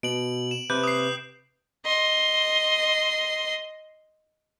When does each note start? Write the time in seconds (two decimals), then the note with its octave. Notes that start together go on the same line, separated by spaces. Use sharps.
0.03 B2 D7 F#7
0.51 E7
0.70 C3 B4 D6 G6
0.84 D#6 C7
1.85 D#5 C6